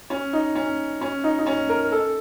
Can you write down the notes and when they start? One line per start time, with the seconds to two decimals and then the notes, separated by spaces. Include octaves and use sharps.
0.10 C#4
0.33 D#4
0.55 C#4
1.01 C#4
1.24 D#4
1.39 D#4
1.46 C#4
1.69 A#4
1.92 A4